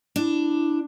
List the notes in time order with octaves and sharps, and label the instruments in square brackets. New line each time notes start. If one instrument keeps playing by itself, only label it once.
[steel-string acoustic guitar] D4 [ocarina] E4